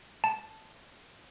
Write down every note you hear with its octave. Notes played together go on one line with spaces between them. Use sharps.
A5